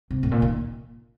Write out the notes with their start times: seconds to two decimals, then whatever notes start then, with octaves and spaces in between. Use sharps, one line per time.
0.11 C3
0.23 A2
0.31 A#2
0.42 D#3